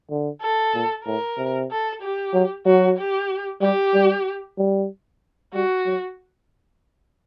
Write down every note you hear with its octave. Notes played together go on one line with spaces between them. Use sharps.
D3
A4
A#2
A2 A#4
C3
A4
G4
F#3
F#3 F#4
G4
G3 G4
G3
G3
G3 F#4
F#3